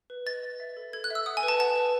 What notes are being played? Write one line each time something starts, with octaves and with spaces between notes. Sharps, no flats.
B4
D#5 A6
D#5
E5
A4
A4 G#6
F#6
E5 E6
F#5 D#6
G#5
B4
A5
F#5 A5
B4